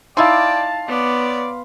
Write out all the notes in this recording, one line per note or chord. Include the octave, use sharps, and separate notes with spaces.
D#4 E4 D5 F5 G5 A5 C6 D6
B3 C#5 D5 D6